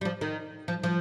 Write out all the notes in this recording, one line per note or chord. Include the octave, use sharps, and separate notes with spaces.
G3
F3
D#3
F3
F3